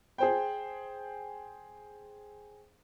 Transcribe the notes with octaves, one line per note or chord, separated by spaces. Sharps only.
G#4 C5 G5